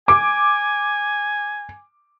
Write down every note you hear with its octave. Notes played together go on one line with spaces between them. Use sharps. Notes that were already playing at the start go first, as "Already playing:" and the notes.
G#5 D6